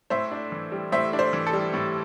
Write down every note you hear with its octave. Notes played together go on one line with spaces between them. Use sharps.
A2 C5 E5
D4
E3
G3
A2 C5 E5
D4
C5
E3
A4
G3
A2